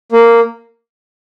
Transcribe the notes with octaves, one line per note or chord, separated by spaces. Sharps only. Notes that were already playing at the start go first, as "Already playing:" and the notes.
A#3